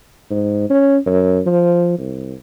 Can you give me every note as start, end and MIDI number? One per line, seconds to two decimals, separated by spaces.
0.30 0.67 44
0.70 0.98 61
1.06 1.40 42
1.46 1.94 53
1.98 2.34 36